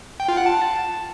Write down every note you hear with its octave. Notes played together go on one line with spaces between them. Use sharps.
G5
F4
F#5
A5